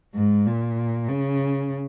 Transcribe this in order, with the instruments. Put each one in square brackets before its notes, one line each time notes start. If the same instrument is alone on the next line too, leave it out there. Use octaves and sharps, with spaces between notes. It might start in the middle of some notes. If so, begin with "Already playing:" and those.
[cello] G#2
A#2
C#3